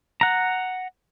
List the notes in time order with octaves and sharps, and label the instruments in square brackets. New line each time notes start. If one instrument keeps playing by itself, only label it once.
[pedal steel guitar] F#5 A#5